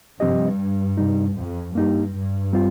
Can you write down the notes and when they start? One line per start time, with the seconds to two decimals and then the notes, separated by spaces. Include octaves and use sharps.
0.20 G2 C3 F3 C4 G4 D#5
0.97 C3 G3 D#4
1.36 F2
1.75 G2 A#3 D#4 G4
2.14 G2
2.53 G3 C4 F4